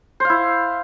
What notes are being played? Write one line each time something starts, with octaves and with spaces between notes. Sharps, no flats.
E4 C5 F5